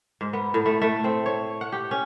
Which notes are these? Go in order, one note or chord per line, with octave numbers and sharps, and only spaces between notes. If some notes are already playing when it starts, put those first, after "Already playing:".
G#2
B3
A2
A3
A3
C4
C#5
F#5
G4
C#4